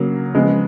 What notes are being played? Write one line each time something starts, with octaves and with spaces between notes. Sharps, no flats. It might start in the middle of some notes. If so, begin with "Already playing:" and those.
Already playing: C#3 F#3 A#3
C#3 F3 G#3 B3